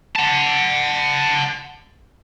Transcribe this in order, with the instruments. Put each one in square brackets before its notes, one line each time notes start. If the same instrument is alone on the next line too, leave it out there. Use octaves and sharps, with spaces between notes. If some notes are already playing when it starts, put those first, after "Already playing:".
[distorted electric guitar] F#5 A5